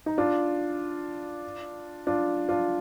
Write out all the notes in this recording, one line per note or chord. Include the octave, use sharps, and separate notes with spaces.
D#4
D4 F4
D4 F4
D4 F4